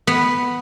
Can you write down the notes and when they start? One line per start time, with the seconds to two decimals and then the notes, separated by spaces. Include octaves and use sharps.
0.07 B3